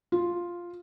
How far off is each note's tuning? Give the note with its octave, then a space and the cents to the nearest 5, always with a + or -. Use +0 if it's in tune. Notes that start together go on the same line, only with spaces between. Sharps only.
F4 +0